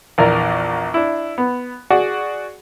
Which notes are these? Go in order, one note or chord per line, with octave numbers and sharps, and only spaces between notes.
A#1 E2 A#4 D5 A#5
D4 E4
B3
F#4 G#4 D5 F#5